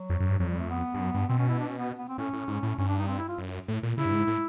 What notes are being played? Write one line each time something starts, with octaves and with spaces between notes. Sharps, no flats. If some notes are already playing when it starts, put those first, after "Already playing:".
Already playing: F#3
F2
F#2
G2
F2 F#3
G3
A3
B3
G2
F#2
G2
B2 C4
C#4
E4
D4
C#4
B3
B3
C4
A2 C#4
A2
G#2
A2
G2 C#4
D4
D#4
C4
E4
F4
F#2
A2
A#2
C#3 E4
G2
G#2
A2